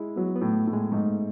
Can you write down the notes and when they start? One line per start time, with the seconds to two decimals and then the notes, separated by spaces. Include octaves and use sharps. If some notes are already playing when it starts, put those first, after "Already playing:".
Already playing: G#3 E4
0.16 F#3 B3
0.36 B3
0.41 A2
0.54 A3
0.67 A2
0.73 G#3
0.92 G#2 A3